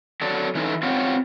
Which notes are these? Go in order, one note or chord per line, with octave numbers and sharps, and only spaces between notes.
F#3 A4 D5
E3 C#4 D#4 A4
C4 C#4 F4 G4 F#5